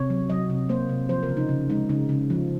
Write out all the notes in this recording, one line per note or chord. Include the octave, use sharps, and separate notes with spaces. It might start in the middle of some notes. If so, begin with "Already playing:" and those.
Already playing: C3 C#5
F#3
F#3 D#5
C3
A#3 C5
C3
F3 C5
A#4
C#3
D#4
C#3
G#3 D#4
C#3 D#4
C#3
F3